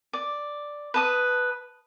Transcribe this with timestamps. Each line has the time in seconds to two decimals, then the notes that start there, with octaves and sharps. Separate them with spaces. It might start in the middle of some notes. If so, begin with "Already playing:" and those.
0.13 D5
0.94 B4 A5 D#6